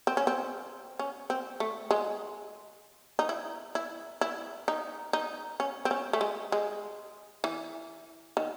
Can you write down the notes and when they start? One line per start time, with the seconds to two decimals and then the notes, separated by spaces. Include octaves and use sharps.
0.07 C4
0.17 C#4
0.27 C4
0.99 C#4
1.30 C4
1.60 A3
1.91 G#3
3.19 D#4
3.29 E4
3.75 E4
4.21 E4
4.68 D#4
5.13 D#4
5.60 C#4
5.85 C4
5.91 C#4
6.13 A3
6.21 G#3
6.52 G#3
7.44 E3
8.37 D#3